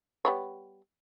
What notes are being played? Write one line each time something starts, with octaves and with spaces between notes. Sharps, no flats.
G3 B3 C#5